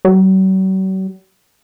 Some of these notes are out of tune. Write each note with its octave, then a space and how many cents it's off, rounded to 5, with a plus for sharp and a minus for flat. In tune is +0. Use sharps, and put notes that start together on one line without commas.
F#3 +45